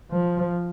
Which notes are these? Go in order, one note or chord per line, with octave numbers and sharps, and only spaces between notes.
F3